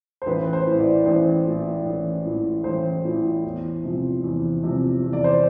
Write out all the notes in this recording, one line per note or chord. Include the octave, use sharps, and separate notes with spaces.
C5
A1 B4
C5
A2 E3
D5
A1 C5
A2 E3
A1
A2 E3
A1 C5
A2 E3
E2
C3 F3
E2
C3 F3
E2
D5
C5